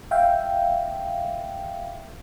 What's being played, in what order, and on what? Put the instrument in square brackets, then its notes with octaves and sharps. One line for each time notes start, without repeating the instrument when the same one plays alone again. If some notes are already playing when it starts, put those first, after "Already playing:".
[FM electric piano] E5 F5 G5